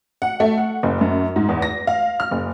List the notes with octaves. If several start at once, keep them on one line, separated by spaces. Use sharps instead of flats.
F#5
A3
F#5
F#1
F#2
G#2
E2
A#6
F5
F6
F#1